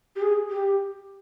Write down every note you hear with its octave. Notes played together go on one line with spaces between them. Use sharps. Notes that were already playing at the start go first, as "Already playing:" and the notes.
G4
G#4
G4